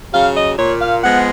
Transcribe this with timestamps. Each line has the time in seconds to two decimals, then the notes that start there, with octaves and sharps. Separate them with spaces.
0.13 C#3 F#3 F5
0.35 D#5
0.58 A#2 C#5
0.81 F5
1.03 F3 G#3 B3 F#5